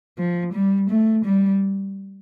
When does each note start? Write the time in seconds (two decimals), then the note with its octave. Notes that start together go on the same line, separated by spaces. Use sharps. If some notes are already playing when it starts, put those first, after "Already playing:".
0.18 F3
0.54 G3
0.90 A3
1.25 G3